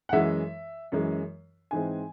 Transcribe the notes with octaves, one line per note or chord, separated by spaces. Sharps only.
F#5
F#2 E3 G#3 E5
F#2 E3 G#3
G#2 E3 G#3 C4 G#5